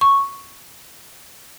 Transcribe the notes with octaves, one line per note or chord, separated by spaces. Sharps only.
C#6